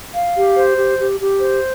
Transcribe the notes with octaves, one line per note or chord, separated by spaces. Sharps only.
F5
G4
C5
G4
G4
G4
C5